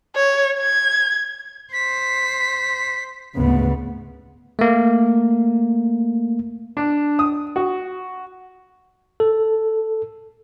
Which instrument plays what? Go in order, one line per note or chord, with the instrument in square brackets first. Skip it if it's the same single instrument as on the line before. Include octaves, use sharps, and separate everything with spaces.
[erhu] C#5
G#6
[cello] C5 [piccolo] B6
[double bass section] D2 C#3 B3 [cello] G#2
[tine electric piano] A3 A#3
[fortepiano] D4
D#6
F#4
[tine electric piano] A4